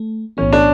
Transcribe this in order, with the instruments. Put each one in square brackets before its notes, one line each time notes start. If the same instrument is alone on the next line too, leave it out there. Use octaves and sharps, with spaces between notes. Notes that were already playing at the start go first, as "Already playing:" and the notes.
Already playing: [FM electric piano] A3
[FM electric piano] B1 A2 E3 B3 [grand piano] C#4
[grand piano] D4